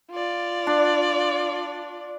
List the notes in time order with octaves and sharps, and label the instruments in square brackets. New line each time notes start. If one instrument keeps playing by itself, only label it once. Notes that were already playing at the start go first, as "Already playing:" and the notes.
[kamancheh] F4 D5
[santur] D4